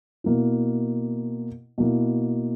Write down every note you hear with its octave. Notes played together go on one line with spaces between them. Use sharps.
B2 A#3 E4
B2 A#3 E4